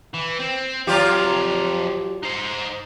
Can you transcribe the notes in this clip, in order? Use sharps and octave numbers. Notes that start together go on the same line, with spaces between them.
E3
C4
F2 F#3 F4 G4 A#5
D#4 C5